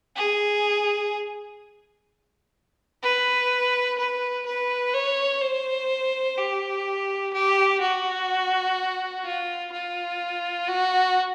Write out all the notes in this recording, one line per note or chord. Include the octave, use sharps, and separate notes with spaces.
G#4
B4
B4
B4
C#5
C5
G4
G4
F#4
F4
F4
F#4